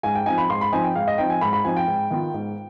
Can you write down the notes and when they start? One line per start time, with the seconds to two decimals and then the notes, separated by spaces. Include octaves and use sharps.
0.03 G#2 G#5
0.15 G5
0.26 F3 C4 D#4 G#5
0.38 B5
0.50 G#2 C6
0.61 B5
0.72 F3 C4 D#4 G#5
0.84 G5
0.95 G#2 F5
1.07 D#5
1.18 F3 C4 D#4 G5
1.30 G#5
1.41 G#2 B5
1.53 B5
1.65 F3 C4 D#4 G#5
1.76 G5
1.88 G#2
2.10 D#3 B3 F4
2.34 G#2